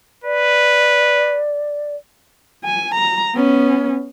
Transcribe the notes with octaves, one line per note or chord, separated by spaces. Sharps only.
B4 D5
G#5
A#5
B3 C#4